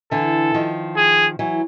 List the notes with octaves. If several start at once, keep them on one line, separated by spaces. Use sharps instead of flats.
D3 E3 A4
D#3 F3
G#4
E3 F#3